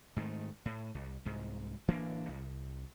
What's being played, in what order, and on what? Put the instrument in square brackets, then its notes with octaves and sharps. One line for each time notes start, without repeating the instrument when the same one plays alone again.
[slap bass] G#2 D#3 A3
A2
C2
C2 G#2
D1 E3 A#3 D4
C2